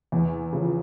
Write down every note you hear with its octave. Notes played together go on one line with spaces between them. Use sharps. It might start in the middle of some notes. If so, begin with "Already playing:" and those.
E2
C#3 F3